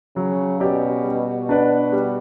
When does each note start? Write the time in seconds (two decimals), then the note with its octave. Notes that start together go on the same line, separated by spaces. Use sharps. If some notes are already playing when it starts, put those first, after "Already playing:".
0.16 C#3 F#3
0.60 B2 C#4 G4 D5
1.04 G3
1.49 D4 F#4 B4 D5
1.92 G3